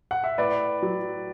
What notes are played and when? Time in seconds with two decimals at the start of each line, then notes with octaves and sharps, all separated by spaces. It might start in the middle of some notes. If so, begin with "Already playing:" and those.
0.11 F#5
0.24 E5
0.38 A2 B4 D5
0.82 F#3